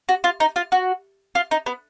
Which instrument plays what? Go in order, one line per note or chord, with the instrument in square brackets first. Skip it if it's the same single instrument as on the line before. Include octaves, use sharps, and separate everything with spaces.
[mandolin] F#4
F4
D#4
F4
F#4
F4
D#4
B3